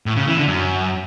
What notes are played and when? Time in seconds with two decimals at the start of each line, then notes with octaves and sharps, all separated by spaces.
0.06 A2
0.16 C#3
0.27 E3
0.37 D3
0.47 F#2